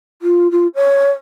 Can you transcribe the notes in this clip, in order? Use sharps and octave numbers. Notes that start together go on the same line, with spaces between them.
F4
F4
C#5